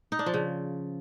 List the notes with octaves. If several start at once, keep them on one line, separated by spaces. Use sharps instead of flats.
D#4
D4
F3
C#3